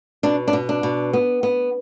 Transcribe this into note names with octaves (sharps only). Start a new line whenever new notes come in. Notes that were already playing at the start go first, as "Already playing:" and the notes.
B2 D4
D4
B2
D4
B2
B3
B3